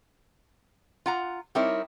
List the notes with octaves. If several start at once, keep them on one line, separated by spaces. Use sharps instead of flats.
F4 F#5 A#5
G3 C4 D#4 E4 A#4 C#5